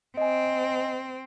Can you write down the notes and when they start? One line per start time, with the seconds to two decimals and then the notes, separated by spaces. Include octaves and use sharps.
0.17 C4 D#5 G#5